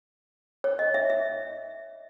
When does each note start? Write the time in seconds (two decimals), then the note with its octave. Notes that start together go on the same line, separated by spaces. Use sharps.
0.64 C#5
0.79 D#5
0.94 E5
1.10 E5